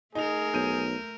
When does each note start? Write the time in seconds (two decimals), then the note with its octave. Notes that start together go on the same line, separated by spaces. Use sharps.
0.15 A3 D#4 G#4 A#4 F7
0.54 B1 G6 D#7